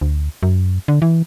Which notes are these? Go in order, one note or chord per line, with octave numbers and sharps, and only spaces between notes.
D2
F#2
D3
E3